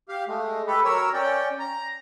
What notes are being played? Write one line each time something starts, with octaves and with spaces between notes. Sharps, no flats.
G4 F5
G#3 A3
G4 A4 B4
F#3 A#4 C#5 E6
C#4 D5 G5
A#5